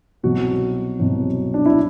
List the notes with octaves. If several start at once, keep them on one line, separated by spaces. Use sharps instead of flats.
C2 B2 F#3 F#4
C2 B2 F#3
D4
E4